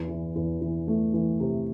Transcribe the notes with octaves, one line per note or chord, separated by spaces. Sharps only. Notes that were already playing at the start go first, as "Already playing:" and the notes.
Already playing: E2
E3
E2
E3
A3
E3
C3